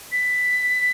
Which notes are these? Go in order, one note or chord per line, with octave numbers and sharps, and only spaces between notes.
B6